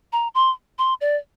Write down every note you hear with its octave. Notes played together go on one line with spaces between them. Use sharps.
A#5
C6
C6
D5